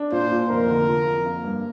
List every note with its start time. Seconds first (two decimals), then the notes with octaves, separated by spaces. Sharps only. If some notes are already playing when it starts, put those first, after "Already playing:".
Already playing: D4
0.12 A#2 C5
0.31 A#2
0.49 F1 A#4
0.69 D3
0.88 F3
1.06 F2
1.26 A#3
1.44 G2